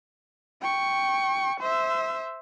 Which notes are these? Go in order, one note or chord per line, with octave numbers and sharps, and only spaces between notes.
G5 C#6
C5 E5